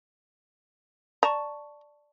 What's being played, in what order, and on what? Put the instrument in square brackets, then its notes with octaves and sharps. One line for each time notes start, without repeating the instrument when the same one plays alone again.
[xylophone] D5 A5 C#6 [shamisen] A#5